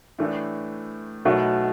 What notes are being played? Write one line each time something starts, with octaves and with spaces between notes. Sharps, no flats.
A2 E3 A3 D4
B1 B2 F#3 A3 E4